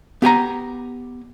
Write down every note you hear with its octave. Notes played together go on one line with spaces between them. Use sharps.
B3 G4 G#5 A#5